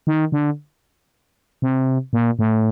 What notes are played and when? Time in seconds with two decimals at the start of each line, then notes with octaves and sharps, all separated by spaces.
0.07 D#3
0.32 D3
1.62 C3
2.13 A#2
2.39 A2